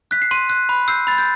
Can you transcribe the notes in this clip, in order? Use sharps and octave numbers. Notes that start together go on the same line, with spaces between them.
F#6 B6
C7
C6 D#7
F#6
B5
E6 G6 C7
B5 A6
G6